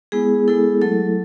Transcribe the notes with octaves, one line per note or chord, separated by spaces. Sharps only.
G#3 B3 E4 G#4
G#3 B3 E4 A4
F#3 A3 E4 A4